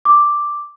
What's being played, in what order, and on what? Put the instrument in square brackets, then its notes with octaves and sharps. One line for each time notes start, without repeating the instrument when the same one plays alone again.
[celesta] D6